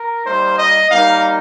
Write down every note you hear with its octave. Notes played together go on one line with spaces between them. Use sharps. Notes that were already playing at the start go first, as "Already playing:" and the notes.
Already playing: A#4
G3 A#3 D#4 C5
D#5
G3 A#3 D#4 F5